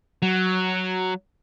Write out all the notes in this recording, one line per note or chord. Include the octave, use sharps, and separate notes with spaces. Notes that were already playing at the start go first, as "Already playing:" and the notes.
F#3